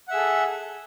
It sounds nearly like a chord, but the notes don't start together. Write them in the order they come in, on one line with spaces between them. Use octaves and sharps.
F#5 E5 G#4 A4